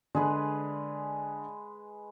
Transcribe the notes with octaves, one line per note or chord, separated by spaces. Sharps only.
D3 G#3 G#4 B4